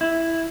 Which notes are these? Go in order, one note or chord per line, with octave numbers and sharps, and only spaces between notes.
E4